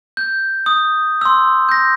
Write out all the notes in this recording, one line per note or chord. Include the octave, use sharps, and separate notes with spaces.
G6
D#6
C6 E6
G6 A#6